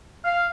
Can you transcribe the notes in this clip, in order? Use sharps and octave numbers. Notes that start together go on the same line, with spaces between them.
F5